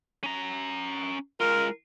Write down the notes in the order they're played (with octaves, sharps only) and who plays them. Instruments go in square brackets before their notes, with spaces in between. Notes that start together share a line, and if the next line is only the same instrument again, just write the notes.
[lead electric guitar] C#4 A#5
[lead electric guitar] G#3 F4 [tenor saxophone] A#4